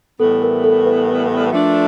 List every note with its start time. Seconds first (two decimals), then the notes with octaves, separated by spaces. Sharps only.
0.20 A2 E3 G3 B3 A4
0.42 A#4
0.64 A4
0.86 B4
1.52 F3 A3 D4